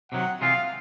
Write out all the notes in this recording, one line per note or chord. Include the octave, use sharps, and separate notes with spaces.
C3 D#3 F#3 F#5
C3 E3 G#3 C4 F4 F5